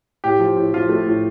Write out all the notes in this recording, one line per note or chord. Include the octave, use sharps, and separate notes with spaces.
A2 G4
F3
A2
F3 F4
A3
A2